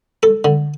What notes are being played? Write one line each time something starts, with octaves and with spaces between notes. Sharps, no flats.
A4
D3